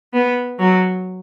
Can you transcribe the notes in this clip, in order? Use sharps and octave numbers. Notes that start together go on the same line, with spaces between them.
B3
F#3